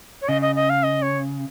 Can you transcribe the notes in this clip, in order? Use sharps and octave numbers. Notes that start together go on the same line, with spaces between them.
C#5
C#3 D#5
D#5
D#5
F5
D#5
C#5